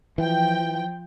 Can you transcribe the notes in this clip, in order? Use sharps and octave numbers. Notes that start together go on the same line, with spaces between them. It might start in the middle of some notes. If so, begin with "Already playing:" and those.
E3 F3 G5